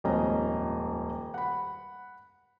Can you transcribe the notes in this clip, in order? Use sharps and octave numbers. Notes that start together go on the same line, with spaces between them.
D#1 F2 G#2 C#4 D#5 A#5
F#5 B5